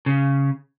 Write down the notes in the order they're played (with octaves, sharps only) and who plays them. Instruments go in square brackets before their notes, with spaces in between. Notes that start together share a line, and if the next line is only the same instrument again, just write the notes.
[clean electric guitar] C#3